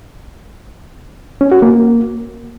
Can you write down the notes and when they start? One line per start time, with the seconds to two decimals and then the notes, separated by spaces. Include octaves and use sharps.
1.41 C#4
1.52 F#4
1.62 A#3